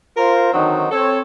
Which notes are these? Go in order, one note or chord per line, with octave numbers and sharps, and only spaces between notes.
F4 A#4 C5
D3 D#3 F#3 C4 D#4 F#4
C4 A4 C#5